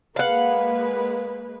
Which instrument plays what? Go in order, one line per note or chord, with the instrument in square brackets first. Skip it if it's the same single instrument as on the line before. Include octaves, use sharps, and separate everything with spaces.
[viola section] G#3 A#3 B4 [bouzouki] F5 F#5